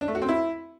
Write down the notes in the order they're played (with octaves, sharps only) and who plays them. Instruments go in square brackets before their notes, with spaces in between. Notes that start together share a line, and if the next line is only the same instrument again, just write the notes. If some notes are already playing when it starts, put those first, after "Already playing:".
[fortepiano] D4
A3
F#4
C4
E4